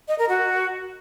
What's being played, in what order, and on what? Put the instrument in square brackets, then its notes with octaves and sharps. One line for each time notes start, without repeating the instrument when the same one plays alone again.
[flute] D#5
A#4
F#4